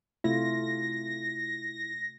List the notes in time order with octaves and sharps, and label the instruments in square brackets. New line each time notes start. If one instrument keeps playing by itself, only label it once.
[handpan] C3 A3 F4 [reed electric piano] E4 [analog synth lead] A#6